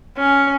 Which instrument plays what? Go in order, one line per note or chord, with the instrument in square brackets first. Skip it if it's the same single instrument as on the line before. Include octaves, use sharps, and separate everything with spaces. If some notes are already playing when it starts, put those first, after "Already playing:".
[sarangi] C#4